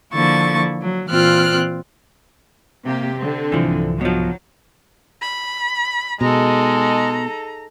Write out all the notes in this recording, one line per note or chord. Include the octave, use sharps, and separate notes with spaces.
D3 F3 A#3 E4 C#6 A6
F#3
A#2 E3 C4 F4 F6 F#6
C3 A#3 G4
D3 C4
C2 G#2 E3 F3
B2 F3 F#3
B5
B2 G#3 D#4 G#4 A4 A#5